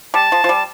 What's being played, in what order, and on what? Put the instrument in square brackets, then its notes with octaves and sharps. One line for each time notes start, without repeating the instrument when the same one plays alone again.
[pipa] G3 [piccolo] A5
[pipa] F3
F3
G3